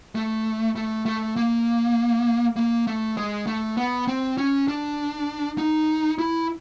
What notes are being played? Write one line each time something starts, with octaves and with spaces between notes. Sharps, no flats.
A3
A3
A3
A#3
A#3
A3
G#3
A3
B3
C4
C#4
D4
D#4
E4